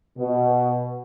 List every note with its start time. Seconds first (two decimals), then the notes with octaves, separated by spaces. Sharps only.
0.18 B2